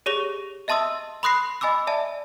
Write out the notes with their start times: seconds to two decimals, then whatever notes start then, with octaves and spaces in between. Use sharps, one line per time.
0.06 G4 G#4 C#5 C#6 A#6 F7
0.68 D#5 E5 A5 C6 D#6 E6
1.23 B5 C6 D#6 F#6 A#6 C7
1.61 D#5 G#5 B5 D6 E6
1.87 D5 E5 G#5 A5